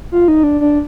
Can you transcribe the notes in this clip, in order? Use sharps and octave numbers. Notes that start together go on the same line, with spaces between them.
F4
D#4
D4
D4